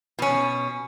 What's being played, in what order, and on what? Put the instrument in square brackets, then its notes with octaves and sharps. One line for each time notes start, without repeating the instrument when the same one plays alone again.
[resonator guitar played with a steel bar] B2 C#4